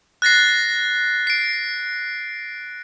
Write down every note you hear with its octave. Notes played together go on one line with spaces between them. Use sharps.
F#6 A6 A#6 C7
C7 D7